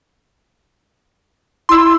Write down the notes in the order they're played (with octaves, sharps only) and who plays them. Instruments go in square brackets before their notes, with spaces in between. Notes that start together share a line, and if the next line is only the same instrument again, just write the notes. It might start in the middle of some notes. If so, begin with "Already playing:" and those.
[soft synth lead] E4 [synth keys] C6 E6